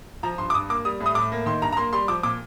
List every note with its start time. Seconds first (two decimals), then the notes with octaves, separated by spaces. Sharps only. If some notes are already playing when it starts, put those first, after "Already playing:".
0.23 F3 A#5
0.38 G2 C6
0.50 D6
0.54 G2 D#6
0.69 A#3 D6
0.85 G3 D#6
1.00 A2
1.06 D#6
1.15 A2 D6
1.32 A#3
1.46 D#3 C6
1.62 G2 A#5
1.72 A#5
1.77 A#3 C6
1.93 G3 C6
2.08 F3 D6
2.23 A#2 D6